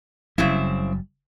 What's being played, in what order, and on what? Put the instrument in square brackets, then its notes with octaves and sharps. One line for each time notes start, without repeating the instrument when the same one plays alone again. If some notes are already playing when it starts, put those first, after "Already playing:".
[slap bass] F#1 F#3 G3 [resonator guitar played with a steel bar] C#3 C4 E4